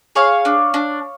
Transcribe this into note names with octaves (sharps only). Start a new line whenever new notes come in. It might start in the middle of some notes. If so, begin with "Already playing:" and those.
G#4 C#5 F5
D4
D4